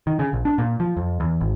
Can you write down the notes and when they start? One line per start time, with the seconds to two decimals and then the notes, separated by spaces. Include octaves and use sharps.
0.07 D#3
0.19 C#3
0.33 A#1
0.45 D4
0.58 A#2
0.80 F3
0.97 F2
1.20 E2
1.41 G#1